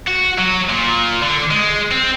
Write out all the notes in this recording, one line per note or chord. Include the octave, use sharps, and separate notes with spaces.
F#4
F#3
A#2
D3
G#3
C4